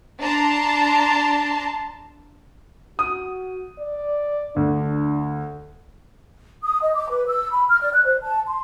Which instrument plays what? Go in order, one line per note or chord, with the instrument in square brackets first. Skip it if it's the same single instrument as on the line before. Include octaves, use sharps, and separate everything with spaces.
[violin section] D4 A5 A#5 C6
[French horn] F#4 [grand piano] D#6
[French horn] D5
[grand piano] D2 [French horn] D4
[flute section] D#6
D#5
D6
B4
E6
B5
F6
D5
F#6
C5
A5
C6